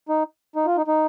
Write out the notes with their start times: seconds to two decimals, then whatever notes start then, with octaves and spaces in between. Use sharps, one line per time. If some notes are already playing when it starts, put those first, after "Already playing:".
0.09 D#4
0.56 D#4
0.66 F4
0.77 D#4
0.88 D#4